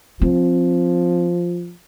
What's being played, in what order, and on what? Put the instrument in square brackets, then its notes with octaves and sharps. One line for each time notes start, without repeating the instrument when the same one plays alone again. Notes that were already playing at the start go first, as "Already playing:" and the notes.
[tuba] F3 [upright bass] C4